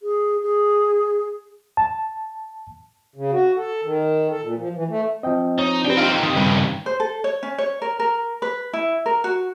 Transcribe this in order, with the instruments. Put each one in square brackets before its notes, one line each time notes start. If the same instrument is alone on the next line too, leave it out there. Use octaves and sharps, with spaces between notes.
[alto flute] G#4
G#4
[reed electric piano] A5
[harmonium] C#3
F#4
A4
D#3
A4
A#2
F3
E3
A3
[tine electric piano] F3 C4 [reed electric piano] D#5 G5
[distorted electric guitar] D#4 [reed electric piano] C#5
[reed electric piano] D4 G4 B4 [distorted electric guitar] C5 G5
[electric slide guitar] D#4 F4 G4 [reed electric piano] F5
[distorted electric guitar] D#3 C4 [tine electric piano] D#6
[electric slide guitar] G2 C#3 G3 [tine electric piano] B4
[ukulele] C5
A4
C#5
C#4
C#5
A#4
A#4
B4
E4
A#4
F#4